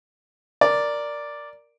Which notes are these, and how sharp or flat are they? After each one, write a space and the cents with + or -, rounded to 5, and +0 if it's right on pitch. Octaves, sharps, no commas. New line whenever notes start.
A#4 +0 D5 +0